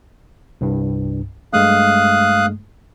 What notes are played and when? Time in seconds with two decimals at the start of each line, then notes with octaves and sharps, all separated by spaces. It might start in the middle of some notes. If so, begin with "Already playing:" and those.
0.61 C2 G2
1.53 G2 G#3 A3 F5 D#6 F#6